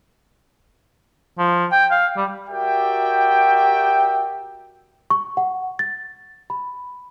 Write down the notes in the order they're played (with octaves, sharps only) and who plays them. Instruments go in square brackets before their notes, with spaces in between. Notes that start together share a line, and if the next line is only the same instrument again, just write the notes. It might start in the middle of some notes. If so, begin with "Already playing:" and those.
[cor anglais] F3
G5
F5
G3
[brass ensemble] F#4 G4 A#4 D5 E5 G5
[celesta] C#6
F#5
A6
B5